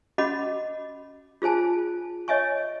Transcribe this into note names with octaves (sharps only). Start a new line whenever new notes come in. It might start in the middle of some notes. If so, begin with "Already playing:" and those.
C#4 F#4 D#5 F#5 B5 D6
F4 G#4 C5 G#5 A5
C#5 D#5 E5 G#5 C#6